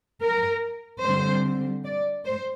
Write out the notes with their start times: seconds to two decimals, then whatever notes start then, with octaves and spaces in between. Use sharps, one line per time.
0.22 A#4
1.03 D3 G3 C4 C5
1.84 D5
2.25 C5